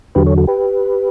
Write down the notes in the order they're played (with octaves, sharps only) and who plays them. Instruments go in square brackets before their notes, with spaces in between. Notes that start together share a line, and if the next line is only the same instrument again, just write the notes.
[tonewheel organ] E2 D3 F#3 G4 B4
A4 C#5
F#4 A4
G4 B4